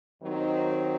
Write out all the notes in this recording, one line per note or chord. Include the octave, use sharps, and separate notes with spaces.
D#2 D#3 F#3 C4 D#4